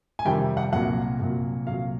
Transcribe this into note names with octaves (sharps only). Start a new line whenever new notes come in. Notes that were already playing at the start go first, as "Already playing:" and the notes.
G#5
F2 C3 D#3 G3 G5
F#5
C2 A#2 F#3 F#5
C2 A#2 F#3
C2 A#2 F#3 F5